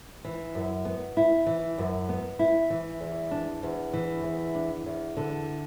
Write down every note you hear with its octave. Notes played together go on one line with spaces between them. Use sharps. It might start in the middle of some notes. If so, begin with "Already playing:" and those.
E3
F#2
B3
E4
E3
F#2
B3
E4
E3
E2
D4
E2
E3
E2
D4
E2
D3